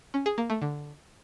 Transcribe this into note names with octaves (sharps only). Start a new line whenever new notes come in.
C#4
G#4
A#3
A3
D3